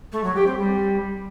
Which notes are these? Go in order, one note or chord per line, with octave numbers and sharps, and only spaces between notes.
A3
F#3
G4
C4
G3